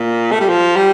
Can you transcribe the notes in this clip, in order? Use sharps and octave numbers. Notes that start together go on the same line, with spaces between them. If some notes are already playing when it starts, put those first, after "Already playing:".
Already playing: A#2
A3
G3
F3
G3